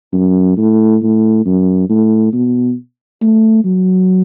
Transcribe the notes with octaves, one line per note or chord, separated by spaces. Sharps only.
F#2
A2
A2
F#2
A2
B2
A3
F#3